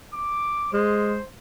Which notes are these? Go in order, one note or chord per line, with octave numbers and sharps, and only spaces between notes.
D6
G#3 C5